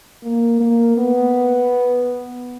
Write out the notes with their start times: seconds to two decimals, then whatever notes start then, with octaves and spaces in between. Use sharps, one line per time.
0.24 A#3
0.60 A#3
0.97 B3